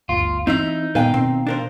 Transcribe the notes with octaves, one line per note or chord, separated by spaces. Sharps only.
G1 D2 F4
E3 C4 D#4 E4 E5
A#2 D#3 B3 B4 D#5 F5 G5
B2 C4
D4 A#4 C5